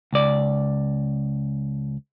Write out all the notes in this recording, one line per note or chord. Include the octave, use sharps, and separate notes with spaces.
C#2 D5